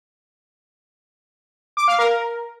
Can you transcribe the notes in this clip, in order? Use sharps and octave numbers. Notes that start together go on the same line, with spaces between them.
D6
F5
A#4